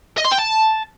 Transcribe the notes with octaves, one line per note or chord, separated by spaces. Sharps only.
D#5
C6
G5
A5